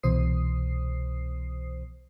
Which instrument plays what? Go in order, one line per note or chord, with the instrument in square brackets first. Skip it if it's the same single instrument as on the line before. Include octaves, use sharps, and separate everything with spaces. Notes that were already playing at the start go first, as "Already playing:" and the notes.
[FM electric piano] C2 B2 E3 C5 D#6 C7